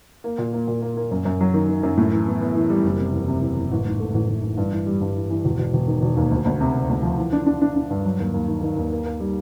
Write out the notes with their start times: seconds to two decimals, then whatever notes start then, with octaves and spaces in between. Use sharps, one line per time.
0.24 A#3
0.38 A#2
0.53 A#3
0.68 A#2
0.82 A#3
0.97 A#3
1.11 F#2
1.25 F#2
1.41 F#3
1.54 D#3
1.69 D#3
1.83 F#2
1.97 A2
2.12 E3
2.27 B3
2.41 B3
2.55 E3
2.70 G3
2.85 F#1
2.99 C3
3.13 E2
3.28 C3
3.42 E2
3.56 F#1
3.71 A1
3.86 G#2
4.00 A3
4.14 A1
4.29 A1
4.43 E3
4.57 G2
4.72 E3
4.87 G3
5.01 G2
5.16 E3
5.30 E3
5.45 E1
5.59 E1
5.73 E1
5.88 D#3
6.02 E1
6.17 D#2
6.31 D2
6.45 D2
6.61 C3
6.74 C3
6.89 D2
7.03 F3
7.17 E3
7.33 D4
7.46 D4
7.62 D4
7.76 D4
7.90 G2
8.05 F#3
8.19 D#2
8.34 D#2
8.48 D#3
8.62 D#3
8.76 D#2
8.91 A#3
9.06 A#3
9.20 G3